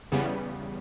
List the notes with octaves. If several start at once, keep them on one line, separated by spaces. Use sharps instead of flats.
E2 C#3 G3 B3